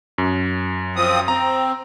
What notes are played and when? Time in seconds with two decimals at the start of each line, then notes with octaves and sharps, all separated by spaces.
0.18 F#2
0.96 F3 C4 D#6
1.28 C4 A#5